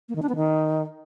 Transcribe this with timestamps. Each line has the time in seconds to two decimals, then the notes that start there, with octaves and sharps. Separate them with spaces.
0.09 A#3
0.16 D#3
0.22 D4
0.29 B3
0.36 D#3